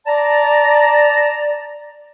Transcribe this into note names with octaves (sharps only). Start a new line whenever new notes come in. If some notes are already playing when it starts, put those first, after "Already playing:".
D5 A5 A#5